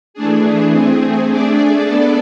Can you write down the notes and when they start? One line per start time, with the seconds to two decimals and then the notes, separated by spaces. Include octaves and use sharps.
0.14 E3 A3 D4 G#4
0.71 A3 C4 G#4
1.27 A3 D4 G#4 D5
1.85 B3 D4 A4 D5